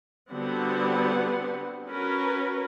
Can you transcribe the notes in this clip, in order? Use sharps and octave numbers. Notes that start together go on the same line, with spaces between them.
D3 G3 B3 C4 F#4 F#5
C#4 F#4 A#4 B4